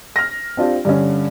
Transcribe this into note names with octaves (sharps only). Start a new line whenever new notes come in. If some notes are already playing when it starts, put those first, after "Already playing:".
F6 A#6
C4 D4 F4 G4
G2 D3 C#4